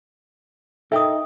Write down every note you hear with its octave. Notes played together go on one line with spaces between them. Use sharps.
D#4 A4 A#4 E5 G5 D#6